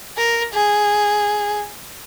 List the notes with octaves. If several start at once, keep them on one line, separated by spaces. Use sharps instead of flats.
A#4
G#4